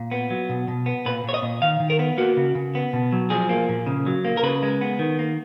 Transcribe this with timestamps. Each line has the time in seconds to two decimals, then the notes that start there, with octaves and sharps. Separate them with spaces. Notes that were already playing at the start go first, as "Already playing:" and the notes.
Already playing: A#2
0.11 B3
0.30 F#3
0.49 B2
0.68 B2
0.86 B3
1.06 A#2 B4
1.24 A#2 C#5
1.34 D#5
1.42 A#2
1.62 D#3 F5
1.80 D#3
1.90 A#4
1.99 B3
2.18 A#3 F#4
2.37 C#3
2.55 C#3
2.75 B3
2.93 B2
3.13 F#3
3.30 F3 G#4
3.49 A#3
3.69 A#2
3.86 C#3
4.06 F#3
4.25 A#3
4.37 A#4
4.43 C#3 B4
4.63 G#3
4.81 B3
4.99 D#3
5.19 A#3